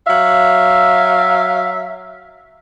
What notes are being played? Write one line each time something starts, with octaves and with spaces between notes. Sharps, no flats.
F#3 E5 F5